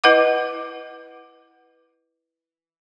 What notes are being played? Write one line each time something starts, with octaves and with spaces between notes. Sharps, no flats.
E4 B4 D#5 F#5 D6